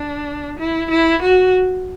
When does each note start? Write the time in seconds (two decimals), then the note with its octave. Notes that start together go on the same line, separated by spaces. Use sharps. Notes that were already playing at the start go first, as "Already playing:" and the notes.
Already playing: D4
0.59 E4
0.90 E4
1.22 F#4